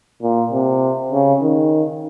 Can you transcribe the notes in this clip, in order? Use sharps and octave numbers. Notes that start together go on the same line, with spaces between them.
A#2
C3
C#3
D#3